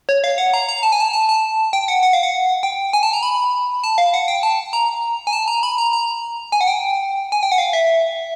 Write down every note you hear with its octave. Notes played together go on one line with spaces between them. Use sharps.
C#5
F5
F#5
A#5
A#5
A5
G#5
A5
A5
A5
G5
F#5
F#5
F5
F#5
G5
G#5
A5
A#5
B5
A5
F5
F#5
G5
A5
A#5
G#5
A5
A#5
B5
A#5
A#5
G#5
F#5
G5
G#5
G5
F#5
F5
E5